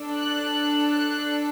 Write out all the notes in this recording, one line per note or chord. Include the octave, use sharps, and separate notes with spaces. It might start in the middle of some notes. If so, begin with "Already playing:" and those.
Already playing: D4 A4
F#6
F#6